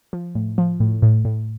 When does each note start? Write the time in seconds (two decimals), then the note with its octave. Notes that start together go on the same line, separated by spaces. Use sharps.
0.13 F3
0.35 A2
0.58 F3
0.80 A2
1.02 A2
1.25 A2